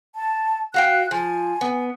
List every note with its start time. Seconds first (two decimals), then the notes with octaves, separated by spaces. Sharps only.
0.15 A5
0.74 F#4 F5 G5 F#6
1.11 F3 G#5
1.61 B3